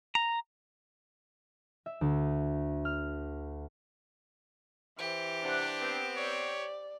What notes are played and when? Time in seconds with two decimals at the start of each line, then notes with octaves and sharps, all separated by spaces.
0.15 A#5
1.86 E5
2.01 D2
2.85 F6
4.99 E3 G4 C5
5.44 C3 D4 F#5
5.80 B3 C4
6.17 C#5 D5